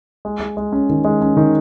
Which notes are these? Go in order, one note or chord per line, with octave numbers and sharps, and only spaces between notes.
G#3
G#3
G#3
C#4
D#3
G#3
C#4
D#3